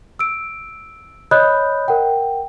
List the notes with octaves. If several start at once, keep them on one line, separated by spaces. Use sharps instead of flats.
E6 D7
C#5 D#5 B5 D#6 F#6 G6
A#4 F#5 G5